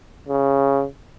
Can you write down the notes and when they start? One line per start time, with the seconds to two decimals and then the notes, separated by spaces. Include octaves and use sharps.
0.28 C#3